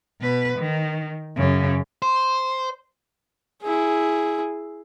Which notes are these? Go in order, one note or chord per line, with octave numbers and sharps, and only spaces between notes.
B2 B4
D#3
F#2 C#3
C5
E4 G#4